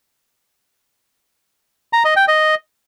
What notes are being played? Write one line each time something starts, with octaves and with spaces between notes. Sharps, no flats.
A#5
D#5
G5
D#5